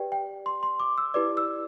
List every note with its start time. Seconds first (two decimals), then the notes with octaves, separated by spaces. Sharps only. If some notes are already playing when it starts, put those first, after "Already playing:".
Already playing: G4 B4 D5 G5
0.12 G5
0.46 C6
0.63 C6
0.80 D6
0.98 E6
1.14 E4 G4 B4 D5 D6
1.37 E6